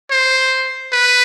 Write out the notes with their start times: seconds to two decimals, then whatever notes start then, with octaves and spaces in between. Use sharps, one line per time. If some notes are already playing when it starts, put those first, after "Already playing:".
0.11 C5
0.93 B4